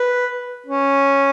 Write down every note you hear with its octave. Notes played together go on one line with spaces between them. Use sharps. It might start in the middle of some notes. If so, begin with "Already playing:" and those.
Already playing: B4
C#4